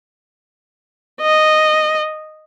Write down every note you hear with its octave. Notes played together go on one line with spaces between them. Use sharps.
D#5